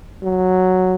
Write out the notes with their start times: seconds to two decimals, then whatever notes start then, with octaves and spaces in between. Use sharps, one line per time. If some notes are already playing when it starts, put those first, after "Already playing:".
0.22 F#3